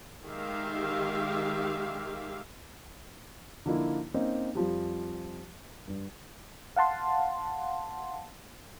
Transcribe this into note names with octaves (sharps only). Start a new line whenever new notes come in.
D#3 G#3 G4 E5 F5
D3 F3 A#3 D#4 E4
A#3 C4 C#4 D#4
F2 F3 G3
G2
F5 F#5 A5 C6